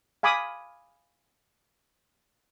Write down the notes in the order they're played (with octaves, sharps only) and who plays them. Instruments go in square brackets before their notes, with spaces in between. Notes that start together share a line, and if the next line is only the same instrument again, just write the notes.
[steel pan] F5 G#5 B5 D6 D#6